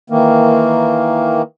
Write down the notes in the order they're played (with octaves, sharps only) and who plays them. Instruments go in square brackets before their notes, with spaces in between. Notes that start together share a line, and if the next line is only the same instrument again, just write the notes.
[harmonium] D#3 E3 A#3